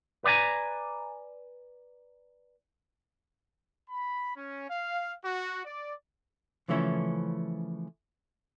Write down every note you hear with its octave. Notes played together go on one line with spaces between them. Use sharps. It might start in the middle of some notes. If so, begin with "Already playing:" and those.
B4 D5 F5 G#5 A#5
B5
C#4
F5
F#4
D5
C#3 E3 F3 A3 C#4 E4